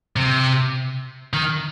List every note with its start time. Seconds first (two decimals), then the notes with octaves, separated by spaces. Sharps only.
0.16 C3
1.33 D#3